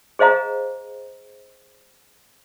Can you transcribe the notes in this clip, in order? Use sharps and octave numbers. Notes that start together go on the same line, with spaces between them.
G#4 C5 D#5 F5 A#5